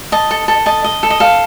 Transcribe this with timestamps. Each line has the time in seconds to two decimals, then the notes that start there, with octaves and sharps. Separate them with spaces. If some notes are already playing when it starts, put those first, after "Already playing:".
0.12 D#5 A5
0.31 A4
0.48 A4
0.66 D#5 A5
0.84 D#5
1.03 A4
1.10 D#5
1.20 A4 F5